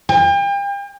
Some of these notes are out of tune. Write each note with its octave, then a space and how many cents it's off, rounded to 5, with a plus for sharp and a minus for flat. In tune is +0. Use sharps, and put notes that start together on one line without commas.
G5 +40